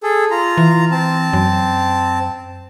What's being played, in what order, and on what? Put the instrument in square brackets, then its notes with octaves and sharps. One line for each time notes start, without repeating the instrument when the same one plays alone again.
[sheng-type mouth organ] G#4 A4
F4 A#5
[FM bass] E3
[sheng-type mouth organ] C4 A5
[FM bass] F#2